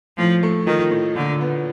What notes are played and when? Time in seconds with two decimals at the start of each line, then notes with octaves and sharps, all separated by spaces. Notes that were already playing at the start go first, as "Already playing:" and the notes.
0.17 A2 F3
0.43 A3
0.66 D#3 F3
0.91 A2
1.16 A#2 D3
1.41 B3